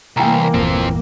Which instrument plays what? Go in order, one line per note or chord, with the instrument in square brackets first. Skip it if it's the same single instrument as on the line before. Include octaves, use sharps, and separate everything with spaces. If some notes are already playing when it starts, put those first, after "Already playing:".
[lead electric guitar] C2 [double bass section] E3 A#3 [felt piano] G5 G#5 A#5
[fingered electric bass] G1 E2 A#2 [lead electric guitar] F3 C4